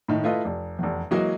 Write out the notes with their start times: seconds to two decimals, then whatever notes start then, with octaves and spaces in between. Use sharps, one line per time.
0.08 A2 D#3
0.24 A3 E4 F4 B4 D#5
0.45 F1
0.79 F1 E2
1.11 E3 F#3 G#3 A#3 F#4 D#5